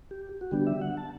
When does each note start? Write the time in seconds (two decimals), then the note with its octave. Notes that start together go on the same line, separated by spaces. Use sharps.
0.11 G4
0.41 F#4
0.51 D3 G3 B3 D4 G4
0.67 E5
0.81 F#5
0.97 A5